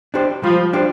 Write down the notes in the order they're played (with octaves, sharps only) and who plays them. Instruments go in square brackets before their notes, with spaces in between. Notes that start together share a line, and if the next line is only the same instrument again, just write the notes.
[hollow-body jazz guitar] D4 G4 C5
[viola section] F3 [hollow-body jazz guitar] G3
[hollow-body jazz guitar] D4 G4 C5